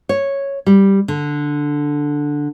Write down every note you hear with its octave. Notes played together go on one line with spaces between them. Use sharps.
C#5
G3
D3